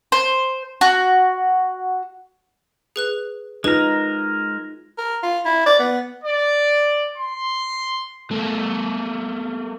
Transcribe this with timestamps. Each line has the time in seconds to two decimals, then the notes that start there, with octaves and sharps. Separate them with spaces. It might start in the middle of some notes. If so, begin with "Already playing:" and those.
0.12 C5
0.81 F#4
2.96 G#4 B4 F#6
3.64 G#3 D#4 F4 G#4 A#4 B4
4.98 A#4
5.23 F4
5.45 E4
5.66 D5
5.79 B3
6.24 D5
7.17 C6
8.31 A3 A#3